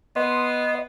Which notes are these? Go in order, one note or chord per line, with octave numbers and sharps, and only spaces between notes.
B3 D#5 C6